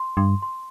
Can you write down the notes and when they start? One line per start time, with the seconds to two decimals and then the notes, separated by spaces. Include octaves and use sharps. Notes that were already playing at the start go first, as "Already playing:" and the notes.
Already playing: C6
0.17 G2 C6
0.42 C6